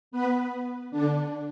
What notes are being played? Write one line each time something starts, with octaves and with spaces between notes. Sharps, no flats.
B3 B4
D3 D4